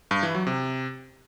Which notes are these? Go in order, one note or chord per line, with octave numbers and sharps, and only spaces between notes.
G2
E3
F#3
C3